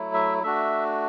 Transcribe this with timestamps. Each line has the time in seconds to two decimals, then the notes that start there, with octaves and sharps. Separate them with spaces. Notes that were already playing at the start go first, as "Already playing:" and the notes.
Already playing: F#3 A3 E4
0.13 E5
0.43 A3 D4 F#4 E5